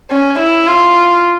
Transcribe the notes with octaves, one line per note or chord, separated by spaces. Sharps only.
C#4
E4
F4